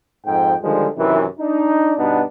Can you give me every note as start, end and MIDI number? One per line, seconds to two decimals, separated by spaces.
0.26 0.53 41
0.26 0.53 44
0.26 0.53 79
0.62 0.87 50
0.62 0.87 51
0.62 0.87 53
0.62 0.87 55
0.62 0.87 56
0.96 1.25 42
0.96 1.25 48
0.96 1.25 51
0.96 1.25 52
1.40 1.94 62
1.40 1.94 63
1.97 2.22 43
1.97 2.22 47
1.97 2.22 59
1.97 2.22 62
1.97 2.22 63